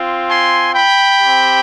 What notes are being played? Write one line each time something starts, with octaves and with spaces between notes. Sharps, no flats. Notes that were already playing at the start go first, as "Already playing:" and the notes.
Already playing: C4 F4
G#5 C6
G5 B5
C4 G4